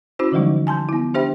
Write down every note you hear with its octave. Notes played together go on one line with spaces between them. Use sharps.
C#4 E4 F#4 C5
D3 E3 F3 G3 G#3 D#4
G#5 A5 C6 G6
B3 E4
D4 G4 C5 E5 G5 B5